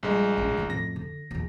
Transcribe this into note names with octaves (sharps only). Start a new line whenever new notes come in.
A#1 G3 G#3
A1
D#3 E4
F2 A2 A#6
D3
A#1 E2